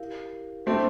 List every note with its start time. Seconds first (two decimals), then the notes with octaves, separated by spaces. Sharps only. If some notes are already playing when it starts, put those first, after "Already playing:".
Already playing: E4 G4 A#4 F5
0.66 G3 A3 A#3 C4 D4 A4